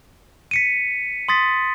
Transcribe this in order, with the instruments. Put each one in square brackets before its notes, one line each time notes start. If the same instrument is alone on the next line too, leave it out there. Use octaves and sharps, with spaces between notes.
[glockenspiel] B6 C#7 D#7
C6 D#6 A6 B6